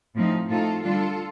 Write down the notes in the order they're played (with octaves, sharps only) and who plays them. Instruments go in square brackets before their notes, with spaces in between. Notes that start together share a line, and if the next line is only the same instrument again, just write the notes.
[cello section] A2 F3 C4 D#4
A2 A3 C4 D#4 F4 A4
D3 G3 D4 F4 A4